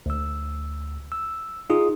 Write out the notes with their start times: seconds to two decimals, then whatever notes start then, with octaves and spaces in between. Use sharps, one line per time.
0.06 D2 E6
1.12 E6
1.70 D#4 F4 G#4 D#6